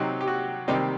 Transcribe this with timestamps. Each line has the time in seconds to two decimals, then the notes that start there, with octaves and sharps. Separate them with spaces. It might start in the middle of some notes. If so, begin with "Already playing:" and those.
Already playing: C3 F#3 C4 D#4
0.21 G4
0.28 F#4
0.68 C3 D#3 G3 C4 D#4 G4